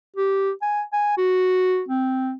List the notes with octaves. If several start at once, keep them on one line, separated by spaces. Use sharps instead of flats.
G4
G#5
G#5
F#4
C4